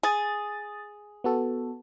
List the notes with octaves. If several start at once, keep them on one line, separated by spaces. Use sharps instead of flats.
G#4 D#6 A6
B3 F#4 A4